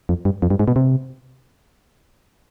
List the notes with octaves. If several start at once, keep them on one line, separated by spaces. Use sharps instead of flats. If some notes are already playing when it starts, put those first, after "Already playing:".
F2
G2
F2
G2
G#2
B2
C3